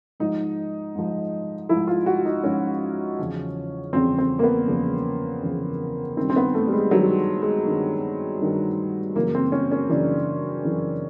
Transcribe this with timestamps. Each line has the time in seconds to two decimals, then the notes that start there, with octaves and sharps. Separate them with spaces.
0.20 G#2 F3 D#4
0.95 G#2 F3
1.69 G#2 F3 E4
1.87 F4
2.06 F#4
2.25 D#4
2.44 G#2 F3 C#4
3.19 E2 C#3 F3
3.93 E2 C#3 F3 C4
4.18 C4
4.39 A#3
4.43 B3
4.68 E2 C#3 F3
5.43 E2 C#3 F3
6.17 D#3 C4
6.22 G2
6.30 C4
6.36 B3
6.54 A3
6.67 G3
6.73 G#3
6.91 G2 D#3 F#3
7.42 G#3
7.66 G2 D#3
8.40 G2 D#3
9.15 F#2 C#3 E3 A#3
9.35 C4
9.52 C#4
9.72 C#4
9.89 F#2 C#3 E3 D4
10.64 F#2 C#3 E3